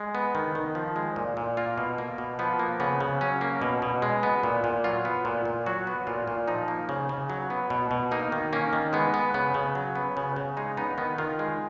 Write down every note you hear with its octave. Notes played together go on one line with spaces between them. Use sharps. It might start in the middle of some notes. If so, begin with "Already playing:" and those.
Already playing: G#3
B3
D#3
D#3
F3
G#3
A#2
A#2
A#3 F4
B2
A#3
B2
F3 B3
A#3
C#3 B3
C#3
F#3 C#4
A#3
B2
B2
G#3
B3
A#2
A#2
F#3 F4
B3
A#2
A#2
F#3 F#4
B3
A#2 F4
A#2
F3 D#4
A#3
C#3
C#3
F#3
B3
B2
B2
A#3 D#4
D#3
A#3 C#4
D#3
G#3 B3
B3
C#3 B3
C#3
F#3
B3
C#3
C#3
G#3 D#4
B3 D#4
D#3 B3
D#3 F4
G#3